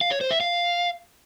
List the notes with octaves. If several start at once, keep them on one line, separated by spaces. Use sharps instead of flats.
F5
C#5
C5
E5
F5